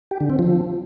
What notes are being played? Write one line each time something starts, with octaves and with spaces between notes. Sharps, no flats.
G4
D3
C4
F3